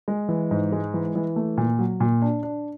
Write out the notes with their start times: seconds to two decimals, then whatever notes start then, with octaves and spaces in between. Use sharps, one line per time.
0.08 G#3
0.29 E3
0.51 G#2
0.72 G#3
0.94 E3
1.15 E3
1.36 A3
1.58 A#2
1.79 F#3
2.00 A#2
2.22 D4
2.43 D4